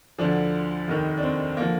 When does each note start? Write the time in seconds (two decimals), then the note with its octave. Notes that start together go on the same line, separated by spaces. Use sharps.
0.19 D2 D3 F3 D4
0.88 F1 D#2 D#3
1.17 D4
1.23 C4
1.57 D3 F3 A#3